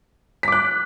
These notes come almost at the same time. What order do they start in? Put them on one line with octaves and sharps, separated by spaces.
B6 D6 F#6